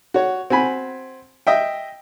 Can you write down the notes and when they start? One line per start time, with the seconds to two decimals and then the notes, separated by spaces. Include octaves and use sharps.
0.14 F#4 C#5
0.50 C4 F#4 G#5 B5
1.47 D#5 E5 G5